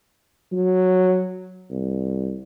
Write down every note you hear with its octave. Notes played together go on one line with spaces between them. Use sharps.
F#3
C2